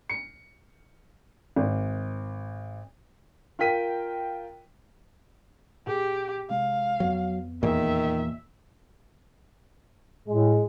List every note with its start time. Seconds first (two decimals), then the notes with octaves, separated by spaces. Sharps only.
0.09 C#7
1.56 G#1
3.59 F4 A#4 G5 B6 D#7
5.87 A#2 G4 G#4 D7
6.50 C3 G#3 F5
7.00 F2 F#3 B3
7.63 E2 A#2 D#3 E5
10.27 A2 G#3